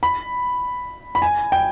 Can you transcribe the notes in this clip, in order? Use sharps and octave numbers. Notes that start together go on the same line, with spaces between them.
B5
B5
G#5
G5